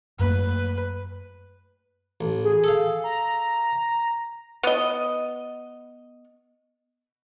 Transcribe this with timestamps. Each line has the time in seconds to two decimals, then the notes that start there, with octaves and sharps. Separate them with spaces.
0.19 F#2 A3 A#3 B4
2.21 A1
2.45 G#4
2.64 A4 F5
3.04 A#5
4.63 B3 D#5